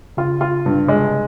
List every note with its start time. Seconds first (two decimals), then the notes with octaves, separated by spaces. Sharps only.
0.17 C#3 F4
0.41 F4
0.66 G2 C3
0.88 G#3